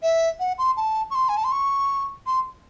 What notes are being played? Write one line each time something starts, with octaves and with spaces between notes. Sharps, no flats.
E5
F#5
C6
A5
C#6
C6
G#5
A5
C6
C#6
C6